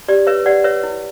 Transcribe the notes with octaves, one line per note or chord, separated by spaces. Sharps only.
G4 D5
B4 C#5 E5
G4 D5 F#5
B4 C#5 E5
E4